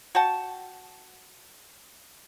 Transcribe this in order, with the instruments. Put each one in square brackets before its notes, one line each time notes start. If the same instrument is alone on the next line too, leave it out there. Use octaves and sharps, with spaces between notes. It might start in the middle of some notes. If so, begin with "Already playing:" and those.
[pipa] F#4 F#5 G5 A5